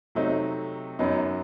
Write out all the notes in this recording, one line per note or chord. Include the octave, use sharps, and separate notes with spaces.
C3 F#3 A3 C4 D#4
F#2 F#3 B3 D#4